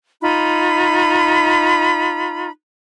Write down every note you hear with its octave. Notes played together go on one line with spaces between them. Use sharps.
D#4 F4 B5